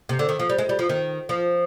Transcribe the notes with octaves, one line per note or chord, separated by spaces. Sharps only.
C3
D3
D#3
F3
G3
G#3
G3
F3
D#3
F3